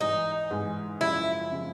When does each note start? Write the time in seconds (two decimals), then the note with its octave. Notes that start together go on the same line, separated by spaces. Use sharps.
0.01 G#2 E3 G#3 D#4
0.51 G#2 E3 G#3
1.01 F#2 C#3 F3 G#3 E4
1.52 C#3 F3 G#3